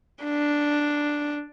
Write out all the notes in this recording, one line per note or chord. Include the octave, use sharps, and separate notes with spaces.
D4